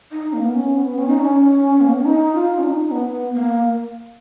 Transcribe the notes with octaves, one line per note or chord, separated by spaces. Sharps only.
D#4
A#3
B3
C#4
B3
C#4
D#4
C#4
A#3
B3
C#4
D#4
F4
C#4
D#4
B3
A#3